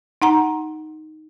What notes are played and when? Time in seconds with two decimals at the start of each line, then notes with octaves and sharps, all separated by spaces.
0.22 D#4 F#5 A#5